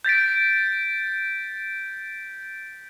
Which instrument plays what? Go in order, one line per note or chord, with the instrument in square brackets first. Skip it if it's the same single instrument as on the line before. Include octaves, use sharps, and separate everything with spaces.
[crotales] G6 A6 B6 D7